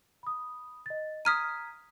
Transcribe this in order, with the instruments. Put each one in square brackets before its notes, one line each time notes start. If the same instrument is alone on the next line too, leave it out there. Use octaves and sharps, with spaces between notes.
[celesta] B5 D#6
D#5 A6
[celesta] A#5 G#6 B6 [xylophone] D#6 F6 D#7